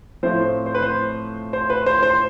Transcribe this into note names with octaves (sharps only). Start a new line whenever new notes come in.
A2 F3 A3 C4 C5
C5
B4
C5
C5
B4
C5
C5